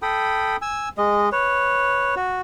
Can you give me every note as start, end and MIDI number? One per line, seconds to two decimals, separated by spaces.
0.02 0.56 69
0.02 0.56 79
0.02 0.56 83
0.02 0.56 87
0.62 0.89 80
0.62 0.89 88
0.98 1.29 56
0.98 1.29 75
1.32 2.15 71
1.32 2.15 73
2.16 2.41 66